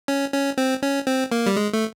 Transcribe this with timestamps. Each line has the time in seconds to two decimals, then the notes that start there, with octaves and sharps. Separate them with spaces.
0.08 C#4
0.33 C#4
0.58 C4
0.83 C#4
1.07 C4
1.32 A#3
1.46 G3
1.57 G#3
1.73 A3